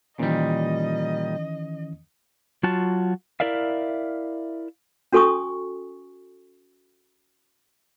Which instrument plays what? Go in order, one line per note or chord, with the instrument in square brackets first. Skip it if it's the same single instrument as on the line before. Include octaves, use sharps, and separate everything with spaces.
[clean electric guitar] A#2 G3 [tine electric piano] D#3 E3 C#4 [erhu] D#5
[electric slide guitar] F#3 F4 F#4 A5
E4 A#4 D5 E5 F5
[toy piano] C#4 F#4 A4 G#5 C#6 D#6